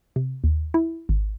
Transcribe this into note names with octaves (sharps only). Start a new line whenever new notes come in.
C3
D#2
E4
G#1